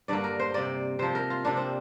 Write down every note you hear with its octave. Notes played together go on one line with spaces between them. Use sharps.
G2 D3 A#3 D5
A#4
C5
C3 A#3 D5
C3 F3 A#3 C5
A#4
F4
C3 A#3 D4
C4